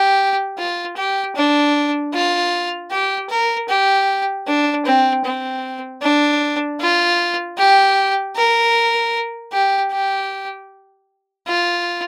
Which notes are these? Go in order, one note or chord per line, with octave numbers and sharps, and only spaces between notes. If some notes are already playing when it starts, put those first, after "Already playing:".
Already playing: G4
F4
G4
D4
F4
G4
A#4
G4
D4
C4
C4
D4
F4
G4
A#4
G4
G4
F4